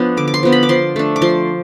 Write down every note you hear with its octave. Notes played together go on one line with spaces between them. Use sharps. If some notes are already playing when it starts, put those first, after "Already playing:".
Already playing: F3 B3 D4
D3 D6
D6
C6
F3 B3 D4
B5
D6
F3 C6
A3 D4
D6
F3 C6